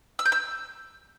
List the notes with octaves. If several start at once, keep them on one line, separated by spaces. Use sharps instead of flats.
E6
G6
E6